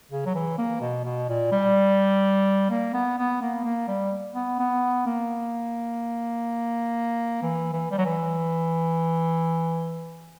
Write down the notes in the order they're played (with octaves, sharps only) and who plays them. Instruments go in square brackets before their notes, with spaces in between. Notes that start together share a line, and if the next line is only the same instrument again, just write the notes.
[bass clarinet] C#3
F#3
E3
A#3
B2
B2
A#2
G3
A#3
B3
B3
A#3
A#3
G3
B3
B3
A#3
E3
E3
G3
F#3
E3